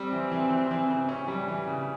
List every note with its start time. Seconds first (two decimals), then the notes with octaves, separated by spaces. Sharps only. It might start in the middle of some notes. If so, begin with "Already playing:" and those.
Already playing: G3 C4
0.12 E3
0.32 E3
0.51 E3
0.71 E3
0.90 C#3
1.09 C#4
1.28 G3
1.48 E3
1.67 C#3